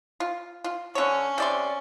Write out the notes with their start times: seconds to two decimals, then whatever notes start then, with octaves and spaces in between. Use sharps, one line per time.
0.20 F4
0.64 F4
0.95 D3 C#4 C#5
1.38 C3 D5 C6